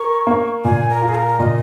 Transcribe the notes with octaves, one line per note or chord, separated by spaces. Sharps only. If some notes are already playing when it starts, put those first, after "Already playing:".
Already playing: A#4 C#6
A#3
A#2 G#5
A#4
F4
G#4
A#4
A#2 D#5